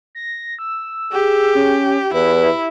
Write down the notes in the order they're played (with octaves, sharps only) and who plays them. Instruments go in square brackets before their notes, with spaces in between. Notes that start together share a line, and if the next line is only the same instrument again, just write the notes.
[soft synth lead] A#6
E6
[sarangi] G4 [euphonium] G#4
[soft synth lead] C#4
[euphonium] E2 [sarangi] E4 [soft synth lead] B4